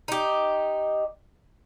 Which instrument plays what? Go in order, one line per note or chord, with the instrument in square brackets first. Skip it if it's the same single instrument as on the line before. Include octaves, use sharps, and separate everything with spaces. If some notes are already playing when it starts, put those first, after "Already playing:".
[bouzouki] D#4 G4